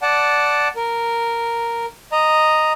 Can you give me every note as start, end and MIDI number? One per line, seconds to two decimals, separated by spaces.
0.02 0.68 74
0.02 0.68 78
0.02 0.68 81
0.76 1.86 70
2.12 2.72 75
2.12 2.72 82